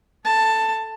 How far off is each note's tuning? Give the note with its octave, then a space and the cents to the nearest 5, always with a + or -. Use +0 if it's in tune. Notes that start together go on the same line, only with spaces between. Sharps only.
A4 +0 A5 +10